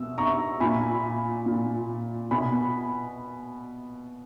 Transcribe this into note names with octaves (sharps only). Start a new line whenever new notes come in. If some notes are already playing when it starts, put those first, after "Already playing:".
Already playing: B2 E6
A#5 C#6
A#2 G#5 B5
A#2
B2 G#5 B5